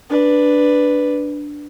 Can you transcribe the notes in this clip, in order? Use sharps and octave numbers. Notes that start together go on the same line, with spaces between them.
D4 B4